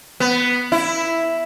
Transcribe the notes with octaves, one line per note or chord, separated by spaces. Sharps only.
B3
E4